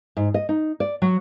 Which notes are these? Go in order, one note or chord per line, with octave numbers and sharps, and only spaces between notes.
G#2
D#5
D#4
D5
F#3